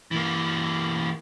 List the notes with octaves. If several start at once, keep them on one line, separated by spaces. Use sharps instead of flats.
E3 A#3